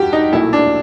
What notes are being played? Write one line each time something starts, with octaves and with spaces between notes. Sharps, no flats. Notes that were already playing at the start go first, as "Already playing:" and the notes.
Already playing: G2 F#4 G4
D#4
B1 A#2 F#3 A3 E4
D4